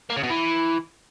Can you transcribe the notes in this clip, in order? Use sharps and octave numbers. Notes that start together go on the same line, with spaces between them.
A#3
C#3
B2
E3